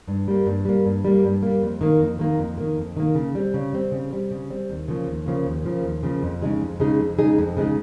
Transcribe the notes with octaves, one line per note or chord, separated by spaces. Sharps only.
G2
G3 A#3
G2
G3 A#3
G2
G3 A#3
G2
G3 A#3
F2
D#3 A#3
F2
D#3 A#3
F2
D#3 A#3
F2
D#3 A#3
C#3
G3 C4
C#3
G3 C4
C#3
G3 C4
C#3
G3 C4
D#2
C#3 F3 A#3
D#2
C#3 F3 A#3
D#2
C#3 F3 A#3
D#2
C#3 F3 A#3
F2
C#3 G#3 D#4 G#4
F2
C#3 G#3 D#4 G#4
F2
C#3 G#3 D#4 G#4
F2
C#3 G#3 D#4 G#4